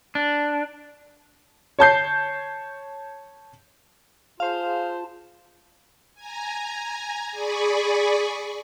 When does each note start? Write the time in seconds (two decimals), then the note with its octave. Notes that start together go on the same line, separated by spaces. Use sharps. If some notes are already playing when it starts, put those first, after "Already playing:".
0.15 D4
1.79 C#5 A5 G6 C7
4.40 F4 G#4 C5 F5 A5
6.14 G#5 A#5
7.31 G#4 D5 G#5 B5 C#6